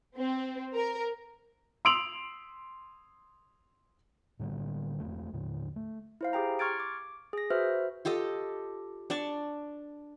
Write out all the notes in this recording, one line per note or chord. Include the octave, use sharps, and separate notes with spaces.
C4
A#4
C6 D#6 E6 D7 F7 F#7
A2 D3 G3 B3
E1 A3
D#2 A2 D3
A3
E4 C5 F5
G4 G#4 G5 A#5
C6 C#6 F6 G#6 A6 D7
D6
G#4 A#6
F#4 B4 C5 E5 F6
F4 G4 A4 D#5
D4 D5 A5 C#6